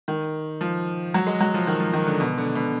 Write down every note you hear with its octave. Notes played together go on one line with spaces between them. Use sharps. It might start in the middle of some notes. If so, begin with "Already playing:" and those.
D#3
F3
F#3
G#3
F#3
F3
D#3
F3
D#3
D3
B2
D3
B2